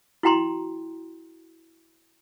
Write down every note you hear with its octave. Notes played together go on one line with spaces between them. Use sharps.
E4 F#4 G5 A#5 C6